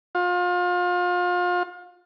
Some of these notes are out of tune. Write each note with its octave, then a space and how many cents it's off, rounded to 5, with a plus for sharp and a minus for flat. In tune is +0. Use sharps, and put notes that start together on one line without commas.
F4 +35